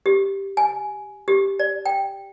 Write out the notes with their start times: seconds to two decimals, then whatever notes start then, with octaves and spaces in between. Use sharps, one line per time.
0.06 G4
0.57 G#5
1.28 G4
1.59 D5
1.86 G5